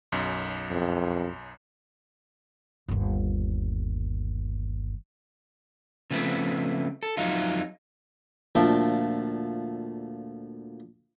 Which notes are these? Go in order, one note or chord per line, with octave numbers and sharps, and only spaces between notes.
B1 F#2
F2
G1 D#2
C#3 F3 A3 B3 C4
A4
F2 F#3 D#4 F4
D2 A#2 F3 A3 G5